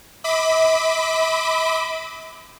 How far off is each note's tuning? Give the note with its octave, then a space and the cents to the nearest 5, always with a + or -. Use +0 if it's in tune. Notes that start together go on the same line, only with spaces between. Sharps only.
E5 -45 B5 +20 D6 +10